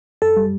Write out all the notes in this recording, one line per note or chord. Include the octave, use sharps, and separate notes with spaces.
F#2 A4
G3